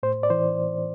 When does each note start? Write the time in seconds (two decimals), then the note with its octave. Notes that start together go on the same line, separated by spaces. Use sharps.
0.03 A2 C5
0.23 D5
0.30 E3 C5